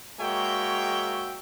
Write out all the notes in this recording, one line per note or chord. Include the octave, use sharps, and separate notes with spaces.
G#3 A#3 F#4 C#5 E5 G5